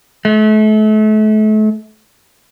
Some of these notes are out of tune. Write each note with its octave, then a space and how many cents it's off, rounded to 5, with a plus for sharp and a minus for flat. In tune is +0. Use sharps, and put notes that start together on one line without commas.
A3 -35